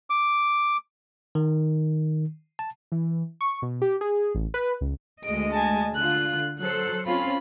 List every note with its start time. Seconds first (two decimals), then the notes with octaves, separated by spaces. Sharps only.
0.10 D6
1.35 D#3
2.59 A5
2.92 E3
3.41 C#6
3.62 B2
3.82 G4
4.01 G#4
4.35 A1
4.54 B4
4.81 C#2
5.24 D2 G#3 D#5 D7
5.53 G#5 A5
5.95 D3 F4 F#6
6.59 F#3 A4 C5 F#6
7.06 C4 C#4 F4 B5